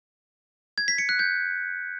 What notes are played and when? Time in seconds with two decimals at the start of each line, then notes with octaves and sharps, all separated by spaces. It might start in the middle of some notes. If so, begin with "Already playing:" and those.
0.78 G#6
0.88 B6
0.98 C#7
1.09 F#6
1.19 G6